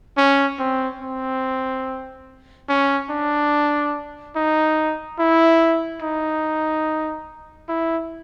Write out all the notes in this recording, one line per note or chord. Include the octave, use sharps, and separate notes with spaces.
C#4
C4
C4
C#4
D4
D#4
E4
D#4
E4